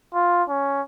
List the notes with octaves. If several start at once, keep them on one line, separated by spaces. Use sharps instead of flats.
F4
C#4